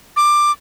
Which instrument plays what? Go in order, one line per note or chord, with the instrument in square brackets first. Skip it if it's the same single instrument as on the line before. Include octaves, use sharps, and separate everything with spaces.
[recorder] D6